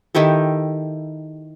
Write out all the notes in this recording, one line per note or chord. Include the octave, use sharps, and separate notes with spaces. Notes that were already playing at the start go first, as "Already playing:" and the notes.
D#3 E4 G4 A4